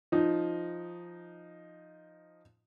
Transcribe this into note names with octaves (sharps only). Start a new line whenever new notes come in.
F3 D#4